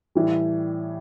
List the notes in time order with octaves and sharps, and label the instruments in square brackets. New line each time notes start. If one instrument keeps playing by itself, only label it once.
[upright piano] A2 E3 G3